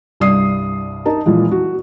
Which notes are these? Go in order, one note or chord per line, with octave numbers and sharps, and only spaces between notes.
C2 G2 D5 D#6 C7
D#4 A#4 A5
A#2 E3 F3 G#3
F#4